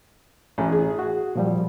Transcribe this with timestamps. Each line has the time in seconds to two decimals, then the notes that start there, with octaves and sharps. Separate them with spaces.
0.58 A1
0.72 G#4
0.99 F#4
1.36 A#2 F3 G3